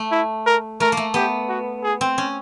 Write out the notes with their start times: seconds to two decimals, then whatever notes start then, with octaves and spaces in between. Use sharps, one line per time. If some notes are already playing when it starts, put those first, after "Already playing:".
Already playing: A3
0.11 E4
0.46 A#4
0.80 A3 A#4
0.92 A#3
0.97 A3
1.14 B3 G4
1.48 F#4
1.83 G#4
2.01 C4
2.18 C#4